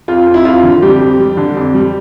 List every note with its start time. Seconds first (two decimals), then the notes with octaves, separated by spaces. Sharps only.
0.08 F2 F4
0.26 F2
0.34 E4
0.45 F2 F4
0.63 D3
0.82 F2 G3 G4
1.00 F2
1.19 G3
1.37 D3
1.57 F2
1.74 G3